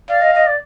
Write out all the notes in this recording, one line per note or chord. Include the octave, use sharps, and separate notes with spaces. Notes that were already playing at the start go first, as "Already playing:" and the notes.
D5 F5
D#5
D#5
D5